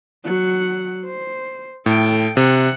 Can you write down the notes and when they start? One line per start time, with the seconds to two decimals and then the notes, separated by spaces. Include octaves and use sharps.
0.24 F#3 F#5
1.05 C5
1.86 A2 A4 G5
2.37 C3 F#5